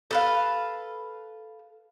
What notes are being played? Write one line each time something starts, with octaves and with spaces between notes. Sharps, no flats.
A4 B4 F5